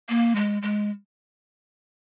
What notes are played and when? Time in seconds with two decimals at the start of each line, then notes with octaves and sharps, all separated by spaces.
0.09 A#3
0.36 G#3
0.62 G#3